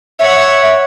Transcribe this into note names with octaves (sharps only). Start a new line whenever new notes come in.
C#5 E5 F#5